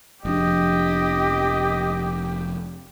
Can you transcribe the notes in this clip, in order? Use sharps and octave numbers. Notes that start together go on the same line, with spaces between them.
F1 F3 D4 G4 D#5